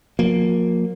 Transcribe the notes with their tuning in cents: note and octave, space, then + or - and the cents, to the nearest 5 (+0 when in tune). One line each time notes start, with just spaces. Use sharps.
F3 +40 A#3 +0